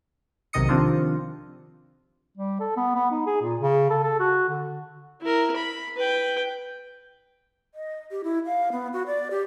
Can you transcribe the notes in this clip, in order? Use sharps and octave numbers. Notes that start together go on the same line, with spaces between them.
B1 C3 D#3 D#5 D#6 C#7
C3 D#3 F3 C4 D4 F4
G3
A4
B3
B3
D#4
G#4
A#2
C#3
A4
A4
F#4
D3
E4 A#4
B5
B4 G5
D#5
G4
E4
F5
B3
F#4
D5
G4